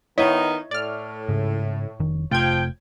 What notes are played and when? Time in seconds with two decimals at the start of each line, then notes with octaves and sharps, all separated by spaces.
0.18 D#3 B3 D#4 E4 C#5 D#5 E5
0.71 A2 D5 F6
1.29 G#2 C#3
2.00 F1 D#3
2.31 F1 C3 F3 A3 F4 G5 G#6